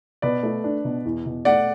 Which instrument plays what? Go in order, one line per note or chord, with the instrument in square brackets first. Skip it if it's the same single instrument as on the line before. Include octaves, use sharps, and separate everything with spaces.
[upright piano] B2 [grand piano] B4 D5
[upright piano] A3
D4
B2
E2
B2
[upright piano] A3 [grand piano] D5 F#5